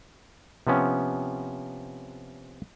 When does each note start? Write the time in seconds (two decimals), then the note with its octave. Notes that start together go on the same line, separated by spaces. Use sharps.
0.67 C3 F3 B3 C#4